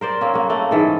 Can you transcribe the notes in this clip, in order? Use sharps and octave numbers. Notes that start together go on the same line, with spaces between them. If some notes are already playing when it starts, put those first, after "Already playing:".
A#4 C5 D5
A#3 C4 C#4
A#3 F#4
A3 A#3
G#2 E3 A4